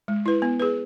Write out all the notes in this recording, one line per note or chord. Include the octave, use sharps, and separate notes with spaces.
G#3
E4 B4
B3
G#4 B4